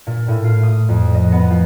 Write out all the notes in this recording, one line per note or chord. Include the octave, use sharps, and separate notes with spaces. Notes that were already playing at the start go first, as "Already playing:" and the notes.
A#2
A2
F4
D#6
F2
D#5
B3
F3